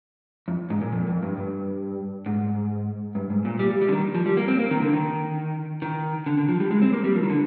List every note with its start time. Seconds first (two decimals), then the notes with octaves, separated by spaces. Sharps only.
0.48 F2
0.70 G#2
0.81 A#2
0.93 F2
1.07 F2
1.22 G2
1.37 G2
2.26 G#2
3.15 G2
3.30 G#2
3.45 A#2
3.59 G3
3.70 G3
3.82 G3
3.88 D3
3.92 D#3
4.15 F3
4.26 G3
4.37 A#3
4.48 C4
4.59 A#3
4.71 D#3
4.81 D3
4.93 D#3
5.82 D#3
6.26 D3
6.37 D3
6.49 F3
6.60 G3
6.71 G#3
6.82 C4
6.93 A#3
7.04 G3
7.15 F3
7.23 D#3
7.30 D3